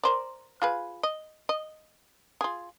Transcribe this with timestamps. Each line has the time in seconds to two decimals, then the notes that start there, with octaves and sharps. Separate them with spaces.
0.03 A#4 C5 D5
0.62 F4 G#4 B4
1.03 D#5
1.49 D#5
2.41 F4 G#4